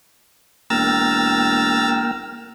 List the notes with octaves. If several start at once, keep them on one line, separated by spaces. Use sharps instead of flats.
E1 A#3 G5 A#5 E6 F6 A6